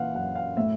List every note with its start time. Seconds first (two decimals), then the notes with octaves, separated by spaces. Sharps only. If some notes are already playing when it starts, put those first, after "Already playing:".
Already playing: A#2 E3 F5 F#5
0.14 F#2 F#5
0.35 F5
0.57 A2 E5